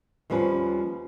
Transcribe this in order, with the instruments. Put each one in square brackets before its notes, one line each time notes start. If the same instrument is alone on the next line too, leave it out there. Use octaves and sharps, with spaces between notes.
[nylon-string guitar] D#2 F3 G3 C#4 B4